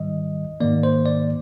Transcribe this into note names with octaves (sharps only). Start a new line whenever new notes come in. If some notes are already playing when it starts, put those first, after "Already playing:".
Already playing: G#2 D#3 G3 D#5
G#2 D#3 A#3 D5
C5
D5